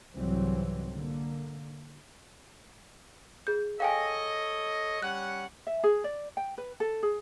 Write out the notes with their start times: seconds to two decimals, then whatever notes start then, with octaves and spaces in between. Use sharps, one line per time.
0.16 C2 G#2 E3 F#3 C4
0.90 D3 A#3
3.47 G#4 G6
3.80 A4 C#5 D#5 F5 G5 G#5
5.02 G3 C#4 F#5 F#6
5.67 E5
5.84 G#4
6.04 D5
6.37 G5
6.58 B4
6.80 A4
7.03 G#4